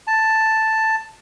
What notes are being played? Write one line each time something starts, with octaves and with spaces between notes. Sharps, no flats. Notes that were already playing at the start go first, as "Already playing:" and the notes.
A5